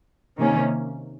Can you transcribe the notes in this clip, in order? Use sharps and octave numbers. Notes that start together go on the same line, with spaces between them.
C3 D#3 A#3 C#4